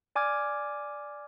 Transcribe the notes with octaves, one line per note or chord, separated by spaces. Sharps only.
D5 G#5 D6 F6 G#6